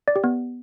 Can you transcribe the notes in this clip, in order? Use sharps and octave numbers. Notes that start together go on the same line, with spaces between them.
D5
G4
B3